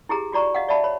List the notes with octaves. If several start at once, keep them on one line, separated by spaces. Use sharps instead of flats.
E4 G4 G#4 A#5
F4 F#4 D5 A#5 C#6
D#5 F5 F#5
D5 E5 F#5 A5 B5
C#5 B5